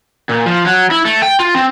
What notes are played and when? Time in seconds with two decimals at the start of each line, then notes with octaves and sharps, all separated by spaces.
0.29 A#2
0.46 F3
0.66 F#3
0.91 E4
1.05 A3
1.22 G5
1.40 F4
1.55 C4